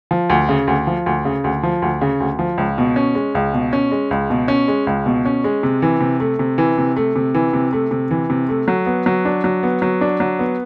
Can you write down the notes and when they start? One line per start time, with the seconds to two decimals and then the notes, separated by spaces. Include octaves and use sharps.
0.11 F3
0.30 D2
0.49 C#3
0.68 D2
0.87 F3
1.06 D2
1.25 C#3
1.44 D2
1.63 F3
1.82 D2
2.01 C#3
2.20 D2
2.39 F3
2.58 C#2
2.78 B2
2.96 C#4
3.15 G#3
3.35 C#2
3.54 B2
3.73 C#4
3.91 G#3
4.11 C#2
4.30 B2
4.48 C#4
4.68 G#3
4.87 C#2
5.06 B2
5.25 C#4
5.44 G#3
5.63 C3
5.82 E3
6.01 C3
6.20 A3
6.39 C3
6.58 E3
6.78 C3
6.96 A3
7.16 C3
7.35 E3
7.53 C3
7.73 A3
7.91 C3
8.11 E3
8.30 C3
8.49 A3
8.68 F#3
8.86 B3
9.06 F#3
9.25 D4
9.44 F#3
9.63 B3
9.82 F#3
10.01 D4
10.20 F#3
10.39 B3